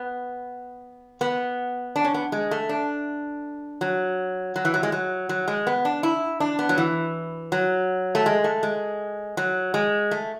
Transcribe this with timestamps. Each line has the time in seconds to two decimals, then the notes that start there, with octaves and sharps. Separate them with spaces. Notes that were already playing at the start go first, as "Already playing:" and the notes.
Already playing: B3
1.21 B3
1.96 D4
2.05 C#4
2.14 B3
2.32 G#3
2.51 A3
2.69 D4
3.81 F#3
4.56 F#3
4.65 E3
4.74 F#3
4.83 G#3
4.92 F#3
5.29 F#3
5.48 G#3
5.67 B3
5.85 D4
6.03 E4
6.40 D4
6.59 B3
6.69 F#3
6.78 E3
7.52 F#3
8.15 A3
8.26 G#3
8.44 A3
8.63 G#3
9.37 F#3
9.74 G#3
10.11 A3